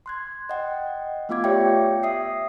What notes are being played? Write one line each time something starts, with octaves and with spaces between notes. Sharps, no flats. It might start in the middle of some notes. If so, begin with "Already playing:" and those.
C6 F#6 G#6
D#5 F#5 G5
A3 B3 F4 F5 D6 G#6
G4 C#5 D5 E5 G5
E5 D#6 C7